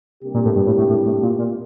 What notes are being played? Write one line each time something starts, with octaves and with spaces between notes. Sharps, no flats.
C3 G3 A#3 D4 G4
A#2
A2
G2
A2
A2
A2
A2
A#2
A#2